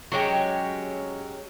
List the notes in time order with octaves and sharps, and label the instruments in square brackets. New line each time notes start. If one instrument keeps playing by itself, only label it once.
[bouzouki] F#3 G#3 C#4 G4